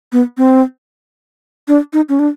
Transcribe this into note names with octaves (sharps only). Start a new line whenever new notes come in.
B3
C4
D4
D#4
C#4
D4